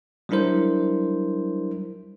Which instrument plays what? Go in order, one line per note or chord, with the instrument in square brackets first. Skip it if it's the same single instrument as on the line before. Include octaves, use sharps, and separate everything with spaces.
[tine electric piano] F#3 G3 D4 E4 A#4 C5